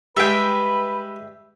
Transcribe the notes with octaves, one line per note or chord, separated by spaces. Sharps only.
G3 G#3 B4 E5 G5